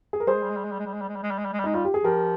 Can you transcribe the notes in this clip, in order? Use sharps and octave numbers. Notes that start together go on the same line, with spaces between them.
G#4
A#4
G3 G#4 C5
G#3
G3
G#3
G3
G#3
G3
G#3
G3
G#3
G3
G#3
G3
G#3
G3
G#3
G3
G#3
G3
G#3 D#4
G3 F4
G4
G#4
F3 G4 A#4